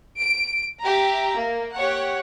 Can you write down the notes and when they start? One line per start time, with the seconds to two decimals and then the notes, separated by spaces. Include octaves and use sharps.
0.20 D7
0.82 G4 E5 A#5
1.35 A#3
1.76 G4 C#5 F#5